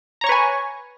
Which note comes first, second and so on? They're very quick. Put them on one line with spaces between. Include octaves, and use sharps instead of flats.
A#5 C#5 C#6 B4 G#5